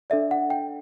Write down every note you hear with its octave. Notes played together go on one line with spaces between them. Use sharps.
D4 A4 D5 E5
F#5
G5